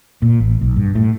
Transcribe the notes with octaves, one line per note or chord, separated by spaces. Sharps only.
A#2
A1
B1
G2
A2